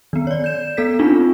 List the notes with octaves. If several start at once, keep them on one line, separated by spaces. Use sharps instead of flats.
D#3 B3
C#5 D5
G6 E7
B3 A4 B6
C4 D4 D#4 F4